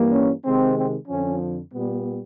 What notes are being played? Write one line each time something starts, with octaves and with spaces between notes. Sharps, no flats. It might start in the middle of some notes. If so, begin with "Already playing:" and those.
Already playing: G2 E3 G3 A#3
C#4
C3 D#3 G#3 C4
C4
F2 D3 F3 C#4
A#2 G3 B3